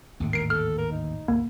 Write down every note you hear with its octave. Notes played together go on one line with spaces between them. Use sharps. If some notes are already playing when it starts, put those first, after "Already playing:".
G#1 D#2 A2 D3
A#4 C7 D7
A4 F6
A#4
D#4
G#1 D2 A#3